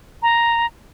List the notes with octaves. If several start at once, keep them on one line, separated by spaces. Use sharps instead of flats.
A#5